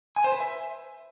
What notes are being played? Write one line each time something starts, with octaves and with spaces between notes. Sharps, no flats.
G#5
C5
B4
E5